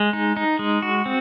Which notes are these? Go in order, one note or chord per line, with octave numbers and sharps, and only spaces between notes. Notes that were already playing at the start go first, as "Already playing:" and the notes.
Already playing: G#3
D#4
D#4
G#3
F#4
C4